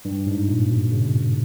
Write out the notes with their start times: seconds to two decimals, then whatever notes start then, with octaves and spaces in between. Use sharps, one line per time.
0.05 G2
0.26 G#2
0.48 A#2
0.70 B2
0.92 C#3